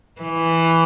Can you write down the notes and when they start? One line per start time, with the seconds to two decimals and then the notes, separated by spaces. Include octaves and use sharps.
0.21 E3